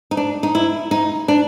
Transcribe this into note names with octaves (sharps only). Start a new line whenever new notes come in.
D#4
D4
D#4
E4
D#4
D4